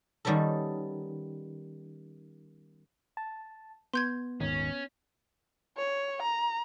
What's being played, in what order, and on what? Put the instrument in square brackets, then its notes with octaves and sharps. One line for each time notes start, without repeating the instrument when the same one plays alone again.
[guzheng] D#3 G3 B3 C#4 A4
[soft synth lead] A5
[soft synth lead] B3 [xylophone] C6 G6 G#6
[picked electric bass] D#1 G#2 D#3 [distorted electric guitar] C#4
[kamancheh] C#5
A#5